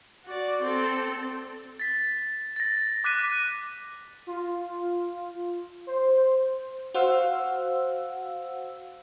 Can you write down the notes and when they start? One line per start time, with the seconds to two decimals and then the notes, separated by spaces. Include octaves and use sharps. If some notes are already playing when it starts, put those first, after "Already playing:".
0.25 F#4 D5
0.62 C4 A4
1.80 A6 B6
2.56 A6 A#6
3.04 D6 F#6 B6 D#7
4.27 F4
5.87 C5
6.94 F#4 C5 F5 F#5 E6